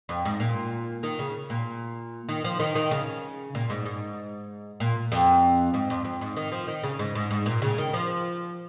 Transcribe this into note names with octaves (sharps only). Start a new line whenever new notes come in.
F2
G#2
A#2
D#3
C#3
A#2
D#3
F3
D#3
D#3
C#3
A#2
G#2
G#2
A#2
F2
G#2
F2
F2
G#2
D#3
F3
D#3
C#3
G#2
G#2
G#2
A#2
C#3
D#3
F3